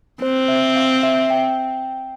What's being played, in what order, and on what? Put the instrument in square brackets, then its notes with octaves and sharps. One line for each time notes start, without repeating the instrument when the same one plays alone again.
[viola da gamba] C4 [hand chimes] C5
[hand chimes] E5
F5
E5
G5